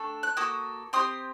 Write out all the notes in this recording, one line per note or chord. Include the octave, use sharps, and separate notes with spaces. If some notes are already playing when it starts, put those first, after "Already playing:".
Already playing: A3 D4 A4 G5
F#6
A#3 F#4 A4 D#6
C4 G4 C6 D#6